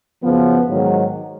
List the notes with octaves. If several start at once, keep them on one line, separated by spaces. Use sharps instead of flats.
F#2 C#3 F3 B3
G#2 D#3 F#3